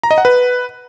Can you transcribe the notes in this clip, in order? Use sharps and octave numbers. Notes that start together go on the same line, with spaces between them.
A#5
D#5
F#5
B4